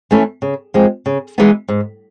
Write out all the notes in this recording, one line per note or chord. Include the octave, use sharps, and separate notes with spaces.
E3 A3 C#4 E4
C#3
F3 G#3 C4
C#3
E3 G#3 B3 D#4
G#2